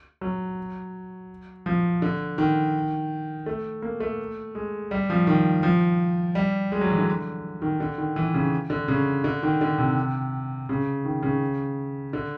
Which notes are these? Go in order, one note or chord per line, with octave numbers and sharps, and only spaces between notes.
F#3
F3
D3
D#3
A3
A#3
A3
G#3
G3
F3
D#3
F3
G3
G#3
F#3
E3
D3
D#3
D3
D#3
E3
C#3
D3
C#3
D3
D#3
D3
C3
C#3
D#3
C#3
D3